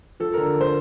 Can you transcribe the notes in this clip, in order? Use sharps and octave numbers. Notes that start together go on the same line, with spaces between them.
F3 A4
D3 A#4
C5